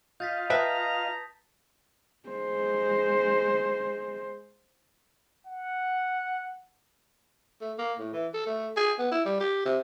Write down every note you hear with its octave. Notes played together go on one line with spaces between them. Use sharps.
F4 D#5 F5 G6 A6 B6
B4 E5 G5 A5 A#5 D#6 B6
G#3 C5
F#5
A3
A#3
A2
E3
A4
A3
G#4
B3
E4
G3
G4
C3